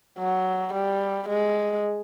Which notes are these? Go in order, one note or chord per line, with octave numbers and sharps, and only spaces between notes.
F#3
G3
G#3